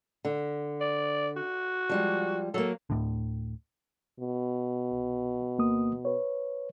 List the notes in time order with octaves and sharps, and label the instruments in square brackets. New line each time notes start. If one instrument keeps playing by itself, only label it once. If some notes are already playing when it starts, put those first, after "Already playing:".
[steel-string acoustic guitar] D3
[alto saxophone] D5
F#4
[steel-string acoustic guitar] F3 G3 G#3
[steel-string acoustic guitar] F#3 A#3 [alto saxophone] A4
[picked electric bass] D2 A2 D3
[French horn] B2
[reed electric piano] C2
D2 A#3 D#6
B4 C#5